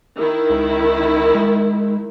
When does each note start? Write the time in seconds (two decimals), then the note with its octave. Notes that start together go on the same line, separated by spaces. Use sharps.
0.17 D#3 E4
0.50 C#2
1.35 G#3